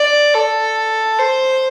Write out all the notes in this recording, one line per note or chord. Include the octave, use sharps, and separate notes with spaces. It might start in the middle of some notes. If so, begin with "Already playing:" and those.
Already playing: D5
A4
C5